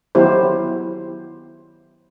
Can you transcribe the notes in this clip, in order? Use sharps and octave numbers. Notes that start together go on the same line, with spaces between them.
D#3 F#3 B3 E4 G4 C5